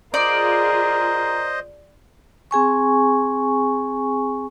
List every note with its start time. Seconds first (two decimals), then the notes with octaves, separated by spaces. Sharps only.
0.14 F4 G#4 A#4 C5 D5 D#5
2.51 C4 G#4 G#5 C#6